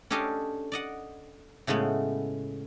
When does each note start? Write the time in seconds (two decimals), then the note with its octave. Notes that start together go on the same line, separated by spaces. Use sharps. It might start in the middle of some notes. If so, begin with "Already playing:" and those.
0.10 C#4 D4 G4 A4 D#5 F5
0.72 D5 D#5 F#5
1.67 A2 C#3 G#3 A3 B3